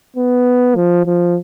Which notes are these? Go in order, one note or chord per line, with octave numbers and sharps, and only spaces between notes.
B3
F3
F3